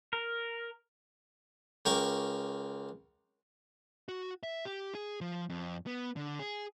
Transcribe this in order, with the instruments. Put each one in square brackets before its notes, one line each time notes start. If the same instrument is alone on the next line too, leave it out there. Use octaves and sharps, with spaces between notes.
[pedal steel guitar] A#4
[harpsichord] C#2 A#4 G5 C#6 D6
[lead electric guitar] F#4
E5
G4
G#4
F3
F2
B3
D3
G#4